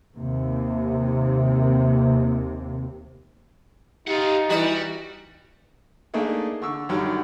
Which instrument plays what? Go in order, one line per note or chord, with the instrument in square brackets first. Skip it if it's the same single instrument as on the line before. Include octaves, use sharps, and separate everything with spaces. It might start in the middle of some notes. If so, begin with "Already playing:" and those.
[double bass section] D#2 C3
[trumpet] D#4 [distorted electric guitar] F4 F#5 [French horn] G4
[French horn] E3 [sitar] G3 [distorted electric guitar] F#4
[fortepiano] A3 A#3 D4 D#4 G#4
D3 C#6 E6
F#2 D3 D#3 F#3 G3